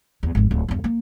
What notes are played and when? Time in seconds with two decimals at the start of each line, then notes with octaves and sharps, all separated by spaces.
0.23 E2
0.35 G#1 F2
0.51 D1
0.68 E2 G2
0.84 A#3